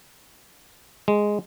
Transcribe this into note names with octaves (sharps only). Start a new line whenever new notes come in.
G#3